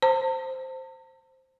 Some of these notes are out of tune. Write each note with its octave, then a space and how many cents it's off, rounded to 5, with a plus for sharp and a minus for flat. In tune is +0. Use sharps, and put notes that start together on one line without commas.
C5 +0 A5 +45